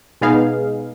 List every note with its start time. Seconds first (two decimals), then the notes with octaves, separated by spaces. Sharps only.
0.21 B2 G#3 B3 D#4 G#4 F5